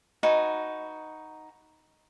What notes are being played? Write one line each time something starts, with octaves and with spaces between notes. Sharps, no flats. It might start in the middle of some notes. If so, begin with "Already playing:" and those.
D#4 F#4 B4 G#5